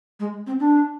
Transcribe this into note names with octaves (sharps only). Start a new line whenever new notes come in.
G#3
C4
D4